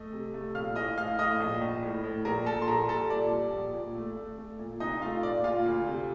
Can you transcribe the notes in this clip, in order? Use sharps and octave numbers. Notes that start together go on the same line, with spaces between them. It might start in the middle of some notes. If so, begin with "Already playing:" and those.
Already playing: A3 D#5
C3
A3
A#1 F5 F6
A2 D#5 D#6
A2 F5 F6
A2 D#5 D#6
A#1
A#1
A2
A2
A#1 A#4 A#5
A#2 A4 A5
C6
A#1 A#4 A#5
G3 A4 A5
A#2 D5
G3
A#1
A#2
A3
A3
A3
A#2
C2 D#4 D#5
A3 F4 F5
A#2 D5
A#2 F4 F5
D2
C3